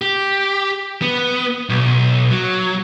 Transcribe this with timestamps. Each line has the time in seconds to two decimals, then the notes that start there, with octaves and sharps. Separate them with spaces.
0.02 G4
1.02 B3
1.70 B1
2.31 F#3